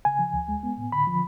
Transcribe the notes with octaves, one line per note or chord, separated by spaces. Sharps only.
C#3 G#5
F3
D2
G#3
B3
A2
D3 B5
F3